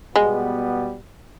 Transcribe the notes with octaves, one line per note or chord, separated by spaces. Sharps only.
B2 G3 G#3 B3